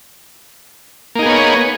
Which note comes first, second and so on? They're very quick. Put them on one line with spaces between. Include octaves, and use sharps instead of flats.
A#3 D#4 G#4 B3 C#5